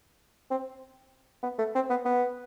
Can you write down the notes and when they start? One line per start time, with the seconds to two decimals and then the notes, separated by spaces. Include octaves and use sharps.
0.51 C4
1.43 B3
1.59 A3
1.75 C4
1.90 B3
2.05 B3